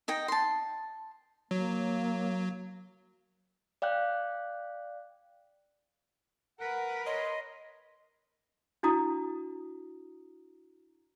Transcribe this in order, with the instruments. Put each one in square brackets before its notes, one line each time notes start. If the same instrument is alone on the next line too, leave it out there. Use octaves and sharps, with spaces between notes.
[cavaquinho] D#4 D#5 G5
A5 C6
[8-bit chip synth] F#3 [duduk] A#3
[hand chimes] D5 F5 G5 F#6
[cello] A#4 B4 [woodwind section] F#5
[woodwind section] C#5 C6 [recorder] D#5
[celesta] D4 E4 F#4 A#5 D#6